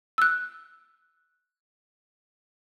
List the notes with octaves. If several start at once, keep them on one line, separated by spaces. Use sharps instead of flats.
E6 F#6